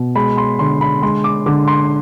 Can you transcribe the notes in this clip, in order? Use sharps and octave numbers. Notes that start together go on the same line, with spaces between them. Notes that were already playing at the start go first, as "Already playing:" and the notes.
Already playing: B2
G#3 B5
C6
D3 C6
B5
G#3 C6
D6
D3 D6
C6